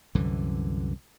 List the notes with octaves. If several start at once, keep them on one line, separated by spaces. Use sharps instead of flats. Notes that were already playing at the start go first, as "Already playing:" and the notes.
C2 F#2 D3 E3